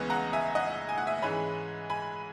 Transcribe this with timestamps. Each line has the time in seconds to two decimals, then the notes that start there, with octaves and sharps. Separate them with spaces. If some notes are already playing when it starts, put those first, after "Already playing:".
Already playing: C#2 C#3 E3 G#3 B3 B4 D#5
0.10 F#5 A#5
0.33 E5 G#5
0.55 D#5 F#5
0.89 G#5
0.98 F#5
1.07 E5 G#5
1.22 G#2 E3 G#3 C#4 G#5 B5
1.90 G#5 B5